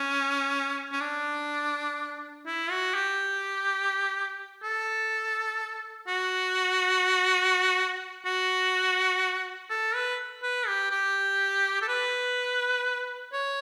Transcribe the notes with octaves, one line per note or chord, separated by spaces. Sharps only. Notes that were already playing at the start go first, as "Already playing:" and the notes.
Already playing: C#4
C#4
D4
E4
F#4
G4
A4
F#4
F#4
A4
B4
B4
G4
G4
A4
B4
C#5